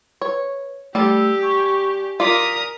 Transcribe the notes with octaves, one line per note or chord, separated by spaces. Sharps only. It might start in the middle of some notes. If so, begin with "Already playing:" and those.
B4 C#5
G3 A3 G4 A5 E6
G#5 C#6
F4 A#4 D5 D#6 B6